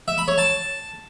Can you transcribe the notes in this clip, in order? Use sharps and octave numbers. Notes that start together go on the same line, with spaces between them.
E5
B5
C#5
A5